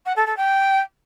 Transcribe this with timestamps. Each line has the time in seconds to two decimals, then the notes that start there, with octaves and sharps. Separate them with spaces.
0.05 F#5
0.16 A4
0.26 A4
0.37 G5